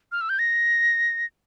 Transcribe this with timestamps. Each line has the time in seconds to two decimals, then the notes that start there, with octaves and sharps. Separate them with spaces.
0.12 F6
0.21 E6
0.29 G6
0.39 A#6